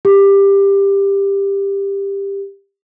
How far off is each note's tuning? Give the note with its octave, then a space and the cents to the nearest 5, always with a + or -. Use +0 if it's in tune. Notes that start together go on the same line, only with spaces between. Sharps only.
G4 +15